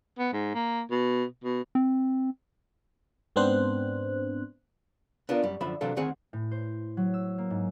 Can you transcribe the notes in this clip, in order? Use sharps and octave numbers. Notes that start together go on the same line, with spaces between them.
B3
G#2
A#3
B2
B2
C4
G#2 B3 C4 D4 C5 F#6
B3 D4 F4 A#4
F#2 G3
F#2 D3 F3 E5 B5
C3 E3 F#3 D4 A4 F5
D2 D#3 C4 G#4 F#5 G#5
A2
C5
F#3
E6
A#3
G#2